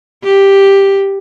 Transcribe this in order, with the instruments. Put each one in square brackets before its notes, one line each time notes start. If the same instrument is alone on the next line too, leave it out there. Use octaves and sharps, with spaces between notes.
[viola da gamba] G4